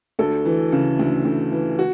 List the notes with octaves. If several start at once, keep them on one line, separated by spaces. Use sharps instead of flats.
D2 A4
E3
C#3
D2
D2
E3
F#4